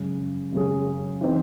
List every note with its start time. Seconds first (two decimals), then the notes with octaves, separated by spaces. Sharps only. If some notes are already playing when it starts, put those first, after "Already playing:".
Already playing: F#2 C#3 G#3 C#4 G#4
0.53 F#2 C#3 G#3 C#4 G#4
1.21 E3 C4 D#4